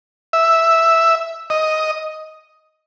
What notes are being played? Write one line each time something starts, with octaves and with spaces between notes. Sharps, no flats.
E5
D#5